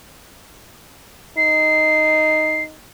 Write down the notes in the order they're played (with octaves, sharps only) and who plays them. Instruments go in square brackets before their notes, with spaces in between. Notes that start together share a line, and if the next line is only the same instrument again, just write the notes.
[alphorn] D#4 [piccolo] C7